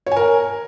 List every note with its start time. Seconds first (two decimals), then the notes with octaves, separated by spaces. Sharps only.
0.06 C#5
0.11 G#5
0.16 A#4